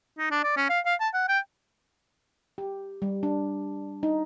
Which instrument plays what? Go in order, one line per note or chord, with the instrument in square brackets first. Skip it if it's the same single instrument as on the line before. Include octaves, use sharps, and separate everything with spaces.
[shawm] D#4
D4
D5
C#4
F5
F5
A5
F#5
G5
[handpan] G4
G3
D4
D#4